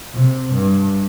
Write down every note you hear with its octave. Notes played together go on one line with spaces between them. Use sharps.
C3
G2